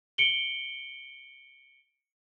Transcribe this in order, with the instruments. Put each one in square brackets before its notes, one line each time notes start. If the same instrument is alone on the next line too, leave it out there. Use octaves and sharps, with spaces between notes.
[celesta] C#7 D7 F#7 G7